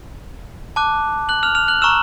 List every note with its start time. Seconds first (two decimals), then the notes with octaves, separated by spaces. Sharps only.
0.76 A5 D6 F#6
1.29 F#6 F#7
1.43 F6 F7
1.55 F6 F7
1.68 F#6 F#7
1.82 A#5 C#6 E6 F6 E7